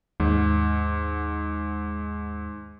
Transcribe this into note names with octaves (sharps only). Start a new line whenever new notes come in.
D#2 G#2